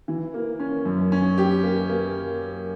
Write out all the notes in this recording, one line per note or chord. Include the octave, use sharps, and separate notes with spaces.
E3
A#3
C#4
F#2
C#4
G4
A#3
A#3